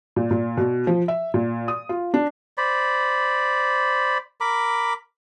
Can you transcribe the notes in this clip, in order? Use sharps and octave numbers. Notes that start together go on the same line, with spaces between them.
A#2
A#2
B2
F3
E5
A#2
D#6
F4
D4
C5 D5 B5
A#4 B5 D6